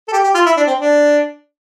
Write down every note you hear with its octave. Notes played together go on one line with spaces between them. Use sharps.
A4
G4
G4
F4
E4
D4
C4
D4